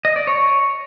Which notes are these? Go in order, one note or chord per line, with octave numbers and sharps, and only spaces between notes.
D#5
D5
C#5